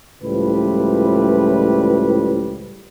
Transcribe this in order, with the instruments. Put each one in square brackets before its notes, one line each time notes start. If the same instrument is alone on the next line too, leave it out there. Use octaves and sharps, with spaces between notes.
[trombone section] C#2 A2 F3 G3 B4